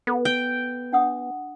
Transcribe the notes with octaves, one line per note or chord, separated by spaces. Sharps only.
B3 A4
G5
D4 F#5 D#6